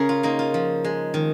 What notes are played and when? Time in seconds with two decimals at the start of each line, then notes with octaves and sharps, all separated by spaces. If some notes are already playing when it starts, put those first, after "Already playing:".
Already playing: C#3 G#4 A#4
0.09 F4
0.23 A#3 D#4
0.39 F4
0.54 F3
0.84 G#3
1.14 D#3